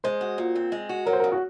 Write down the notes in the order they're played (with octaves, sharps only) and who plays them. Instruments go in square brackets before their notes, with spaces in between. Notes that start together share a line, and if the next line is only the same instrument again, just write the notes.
[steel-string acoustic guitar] G#3 [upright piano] C5
[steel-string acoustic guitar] F#4
A#2
C4
G#3
F#4
[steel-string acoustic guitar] F#3 [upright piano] A#4
[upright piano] C5
A#4
[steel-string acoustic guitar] C#3
[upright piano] F#4